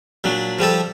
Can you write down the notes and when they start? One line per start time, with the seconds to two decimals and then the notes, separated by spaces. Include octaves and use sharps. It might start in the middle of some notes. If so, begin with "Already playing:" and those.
0.24 A#2 F#3 D4
0.59 F3 G3 G4 A4